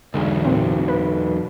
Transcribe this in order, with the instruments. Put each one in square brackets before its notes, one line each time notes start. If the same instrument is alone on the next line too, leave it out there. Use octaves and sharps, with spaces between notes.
[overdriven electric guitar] B1 E2 [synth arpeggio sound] D3 G#3
[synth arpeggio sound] A#2 C4
B4